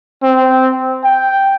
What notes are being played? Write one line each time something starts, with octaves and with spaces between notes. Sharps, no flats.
C4
G5